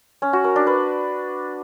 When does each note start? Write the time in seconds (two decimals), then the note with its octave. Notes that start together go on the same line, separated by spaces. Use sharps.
0.22 C#4
0.33 F#4
0.44 A#4
0.56 D4
0.67 B4